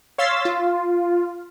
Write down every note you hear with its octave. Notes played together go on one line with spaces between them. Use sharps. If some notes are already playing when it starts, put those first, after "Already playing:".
C#5 F5 C6 E6 A6 B6
F4